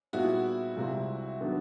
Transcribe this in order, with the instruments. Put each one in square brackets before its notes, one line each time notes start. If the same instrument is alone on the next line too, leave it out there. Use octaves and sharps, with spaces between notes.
[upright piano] A#2 G3 B3 D#4 G#4 [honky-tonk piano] E4 F#4
[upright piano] C2 C3 F3 G#3 C4
D#3 F#3 B3 D4